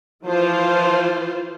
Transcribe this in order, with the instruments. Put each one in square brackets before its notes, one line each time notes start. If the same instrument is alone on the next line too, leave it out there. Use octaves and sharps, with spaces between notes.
[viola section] E3 F4 C5 [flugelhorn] F3